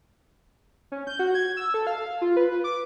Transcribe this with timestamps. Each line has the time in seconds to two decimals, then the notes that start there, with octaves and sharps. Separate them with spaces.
0.92 C#4
1.07 G6
1.19 F#4
1.35 G#6
1.57 E6
1.74 A4
1.87 F5
2.21 F4
2.37 B4
2.64 D6